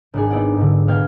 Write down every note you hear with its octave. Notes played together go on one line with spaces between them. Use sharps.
G#1 D4 G#4
B3 D#4 E4 D5 F#5
G#2 D3
B2 B3 F5 G5 G#6